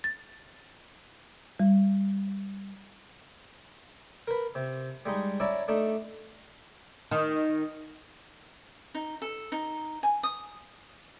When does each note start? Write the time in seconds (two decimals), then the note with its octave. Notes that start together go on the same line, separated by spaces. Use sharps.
0.04 A6
1.60 G3
4.28 A#4 B4
4.55 C3
5.06 G3 G#3 D#4
5.40 C#4 E4 D5 A#5
5.68 A3 D4 D#4
7.11 D#3
8.95 D#4
9.22 A4
9.52 D#4
10.03 G#5
10.23 D#6